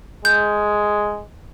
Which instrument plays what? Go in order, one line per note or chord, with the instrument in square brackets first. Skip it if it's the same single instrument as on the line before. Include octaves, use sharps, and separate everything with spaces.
[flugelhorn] G#3 [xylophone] G6